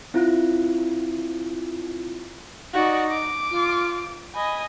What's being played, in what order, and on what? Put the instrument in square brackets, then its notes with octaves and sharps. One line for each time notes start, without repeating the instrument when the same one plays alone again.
[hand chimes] C4 E4 F4
[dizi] D#4 [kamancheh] F#4 D5
[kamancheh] D6
[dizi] F4
[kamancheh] D#5 G#5 [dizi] B5